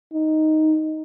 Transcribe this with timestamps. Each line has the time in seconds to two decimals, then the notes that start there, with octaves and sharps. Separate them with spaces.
0.13 D#4